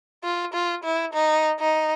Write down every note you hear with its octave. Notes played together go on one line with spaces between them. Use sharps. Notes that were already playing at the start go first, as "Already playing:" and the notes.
F4
F4
E4
D#4
D#4